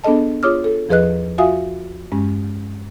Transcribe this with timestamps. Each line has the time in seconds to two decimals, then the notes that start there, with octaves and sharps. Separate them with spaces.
0.04 B3 D4 G#4 A4 D#5 A5
0.43 F4 G#4 C#5 D6 D#6 F6
0.64 A4
0.89 E2 F3 G#4 B4 D#5 F#6
1.38 F4 F#4 E5 F5 G#5 D#6
2.12 G2 G#3 C#4